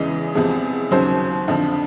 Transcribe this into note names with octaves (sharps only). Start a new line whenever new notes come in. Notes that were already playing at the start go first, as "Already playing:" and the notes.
Already playing: E2 C#3 E3 G#3 D#5
E2 C3 F3 G#3
D#2 C#3 F#3 C5
F2 D3 F3